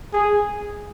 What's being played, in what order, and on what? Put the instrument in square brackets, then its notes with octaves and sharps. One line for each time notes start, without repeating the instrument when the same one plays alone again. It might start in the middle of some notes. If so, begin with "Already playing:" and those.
[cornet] G#4